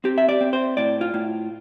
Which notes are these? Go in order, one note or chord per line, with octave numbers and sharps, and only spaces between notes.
C4 G4
E5
D5
C4
C5
A2 D5
F4
A2